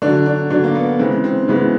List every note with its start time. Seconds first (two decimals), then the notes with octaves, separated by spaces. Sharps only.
0.02 D3 F#3 D4
0.26 D4
0.50 D3 F#3 D4
0.64 A#3
0.75 B3
0.99 C#3 E3 G#3 C4
1.24 C4
1.48 C#3 E3 G#3 B3